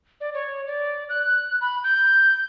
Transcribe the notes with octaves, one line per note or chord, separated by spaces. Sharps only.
D5
C#5
D5
F#6
B5
G6